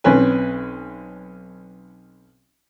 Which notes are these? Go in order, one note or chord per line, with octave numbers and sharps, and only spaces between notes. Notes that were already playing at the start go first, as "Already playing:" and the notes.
B1 C4 C#4 B4 G#5